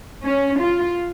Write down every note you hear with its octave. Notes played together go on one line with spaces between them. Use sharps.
C#4
F4